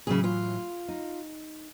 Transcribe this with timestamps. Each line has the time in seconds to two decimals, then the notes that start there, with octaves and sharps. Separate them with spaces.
0.07 A2 C#3 E3 F#3 G#4
0.24 F4
0.88 D#4